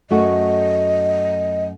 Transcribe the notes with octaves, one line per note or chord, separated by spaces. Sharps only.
F#2 A3 F#4 D#5